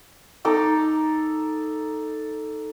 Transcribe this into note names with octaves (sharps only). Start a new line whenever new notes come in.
D#4 A4 A#5 D6